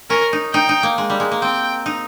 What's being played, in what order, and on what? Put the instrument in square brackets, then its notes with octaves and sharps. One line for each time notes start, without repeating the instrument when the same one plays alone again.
[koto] C#4 [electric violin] A#4
[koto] D#4
[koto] D#4 [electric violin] G5
[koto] D#4
A#3
G#3
G3
G#3
A#3
[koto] C4 [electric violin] G5
[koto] D#4